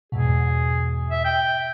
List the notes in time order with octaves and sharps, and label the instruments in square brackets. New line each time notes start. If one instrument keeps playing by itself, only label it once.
[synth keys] E2 G#2 B2 [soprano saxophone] G#4
[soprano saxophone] E5
G5